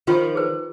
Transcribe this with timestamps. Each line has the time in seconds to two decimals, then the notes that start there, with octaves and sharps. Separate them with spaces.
0.07 D#3 F3 F4
0.35 G#4 B4